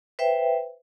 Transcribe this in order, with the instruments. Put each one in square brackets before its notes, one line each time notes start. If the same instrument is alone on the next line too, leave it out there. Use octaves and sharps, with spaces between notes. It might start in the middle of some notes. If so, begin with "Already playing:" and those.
[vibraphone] B4 C5 E5 G5